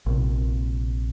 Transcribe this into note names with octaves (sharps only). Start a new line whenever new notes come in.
A#1 C3